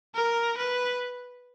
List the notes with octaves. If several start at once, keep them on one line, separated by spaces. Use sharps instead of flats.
A#4
B4